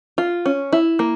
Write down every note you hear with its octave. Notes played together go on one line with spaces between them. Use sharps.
F4
C#4
E4
A#3